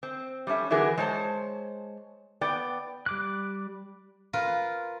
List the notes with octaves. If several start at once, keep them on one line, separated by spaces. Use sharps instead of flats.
C4
G3 A3 C#4 E5
D3 E3 F#3 B3 G#4 A#4
G#3 C5 C#5 A5
B3 D5 G5
G3 D6 F#6
F4 A#4 B4